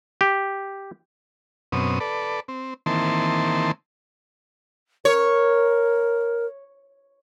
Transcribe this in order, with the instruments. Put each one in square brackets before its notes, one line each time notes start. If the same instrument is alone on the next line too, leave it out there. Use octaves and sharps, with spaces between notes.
[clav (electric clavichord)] G4
[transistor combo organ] F#2 B2 C4 C#4 D#6
A4 B4 D5
C4
D#3 E3 A#3 C4 A5 C6
[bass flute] A#4 [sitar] C#5